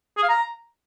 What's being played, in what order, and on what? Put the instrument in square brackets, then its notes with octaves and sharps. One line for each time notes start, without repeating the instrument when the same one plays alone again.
[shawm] G#4
F5
A#5